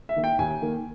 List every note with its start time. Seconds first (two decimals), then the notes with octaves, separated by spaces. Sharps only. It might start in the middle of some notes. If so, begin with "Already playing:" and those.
0.09 E5
0.16 D#3 A#3
0.24 G5
0.38 D#2 G#5
0.62 D#3 A#3